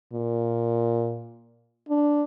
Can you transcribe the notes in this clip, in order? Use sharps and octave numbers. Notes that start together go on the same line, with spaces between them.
A#2
D4